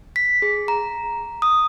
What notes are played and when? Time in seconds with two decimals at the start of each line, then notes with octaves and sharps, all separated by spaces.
0.16 B6
0.42 G#4
0.68 A#5
1.42 D#6